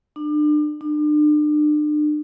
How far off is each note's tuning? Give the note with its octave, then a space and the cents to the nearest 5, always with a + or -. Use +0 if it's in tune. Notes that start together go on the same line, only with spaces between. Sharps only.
D4 +35
D4 +40